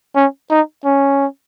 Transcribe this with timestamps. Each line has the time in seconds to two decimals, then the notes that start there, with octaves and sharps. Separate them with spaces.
0.16 C#4
0.50 D#4
0.85 C#4